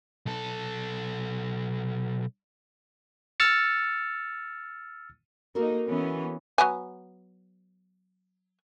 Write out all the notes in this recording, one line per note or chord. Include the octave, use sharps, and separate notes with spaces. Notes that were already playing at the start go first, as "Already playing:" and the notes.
B1 A4
E6 F6 A6 C#7
A#3 D#4 F#4 A4 A#4
E3 B3 C#4
F#3 B3 G#5